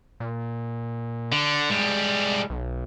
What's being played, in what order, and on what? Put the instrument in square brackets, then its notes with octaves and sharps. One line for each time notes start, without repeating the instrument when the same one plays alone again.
[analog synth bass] A#2
[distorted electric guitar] D3
[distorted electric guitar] A2 G3 [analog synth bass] G#3
[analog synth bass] B1